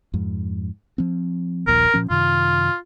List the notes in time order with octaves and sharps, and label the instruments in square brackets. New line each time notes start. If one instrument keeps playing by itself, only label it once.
[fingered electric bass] F2 G#2
F3 C4
[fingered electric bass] D#1 A#1 D#2 [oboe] A#4
[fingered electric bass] A#2 F3 C#4
[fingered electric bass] F#2 C3 D#3 [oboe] F4